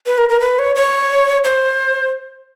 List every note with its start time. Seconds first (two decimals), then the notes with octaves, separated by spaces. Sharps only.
0.06 B4
0.18 A#4
0.29 A#4
0.40 B4
0.59 C#5
0.76 C#5
1.44 C5